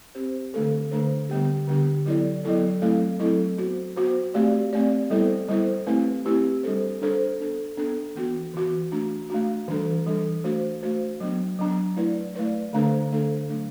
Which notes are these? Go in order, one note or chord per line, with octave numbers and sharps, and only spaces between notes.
C4 G4 C5
D3 A3 D4 A4 C5
D3 A3 D4 A4 C5
D3 G3 B3 D4 G4
D3 G3 B3 D4 G4
F#3 B3 E4 A4 D5
F#3 B3 E4 A4 D5
F#3 A3 C4 E4 A4
F#3 A3 C4 E4 A4
B3 F#4 C5
B3 F#4 C5
A3 C4 G4 D5
A3 C4 G4 D5
G3 B3 E4 A4 C5
G3 B3 E4 A4 C5
A3 C4 E4 G4 B4
A3 C4 E4 G4 B4
G3 D4 A4 C5
G3 D4 A4 C5
B3 D4 A4
B3 D4 A4
E3 B3 F#4
E3 B3 F#4
A3 D4 F#4
A3 D4 F#4
E3 G3 D4 A4
E3 G3 D4 A4
A3 D4 F#4 C5
A3 D4 F#4 C5
F#3 B3 D4
F#3 B3 D4
A3 E4 B4 D5
A3 E4 B4 D5
D3 A3 D4 A4 C5
D3 A3 D4 A4 C5
F#3 A3 D4